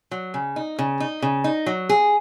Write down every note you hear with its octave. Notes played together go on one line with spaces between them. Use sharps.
F#3
C#3
D#4
C#3
D#4
C#3
D#4
F#3
G#4